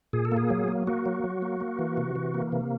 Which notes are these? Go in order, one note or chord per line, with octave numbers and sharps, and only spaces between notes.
A#2 G#4
A4
A#3
G#4
F#3
A#3
A#3 F#4
F#3
F#3
A#3
A#3
E3
C3
E3
A#3
C3